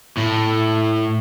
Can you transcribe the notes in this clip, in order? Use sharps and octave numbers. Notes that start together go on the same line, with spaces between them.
A2